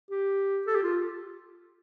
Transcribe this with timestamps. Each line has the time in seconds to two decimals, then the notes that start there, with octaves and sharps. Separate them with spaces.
0.11 G4
0.67 A4
0.75 G4
0.83 F4